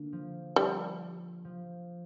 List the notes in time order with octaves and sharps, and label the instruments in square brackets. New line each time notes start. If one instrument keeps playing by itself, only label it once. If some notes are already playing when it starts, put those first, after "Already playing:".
Already playing: [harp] D3 A#3 D4
F3
[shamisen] G3
[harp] F3